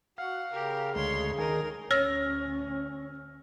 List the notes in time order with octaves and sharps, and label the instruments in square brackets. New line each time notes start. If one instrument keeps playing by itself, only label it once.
[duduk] F#4 [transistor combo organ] F5 [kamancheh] F#5
[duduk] C#3 [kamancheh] G4 A#4
[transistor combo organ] D2 G#3 [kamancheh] C#5 C6
[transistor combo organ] D#3 G#4 [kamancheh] D#4 A#4
[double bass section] D2 C#4 [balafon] C#5 [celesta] E6 [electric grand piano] F6 A#6